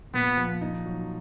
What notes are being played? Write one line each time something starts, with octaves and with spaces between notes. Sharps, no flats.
A#2 B3
F3
D#4
F#3